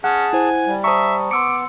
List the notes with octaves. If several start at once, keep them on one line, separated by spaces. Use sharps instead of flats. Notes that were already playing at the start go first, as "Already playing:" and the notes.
C#4 G#4 F#5 A5
E4 C5 G#5
G3
C5 E5 A5 A#5 C#6 D#6
B3 C6 D6 E6 C#7